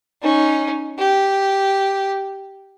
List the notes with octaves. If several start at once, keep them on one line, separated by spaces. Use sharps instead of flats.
C#4 D#4
G4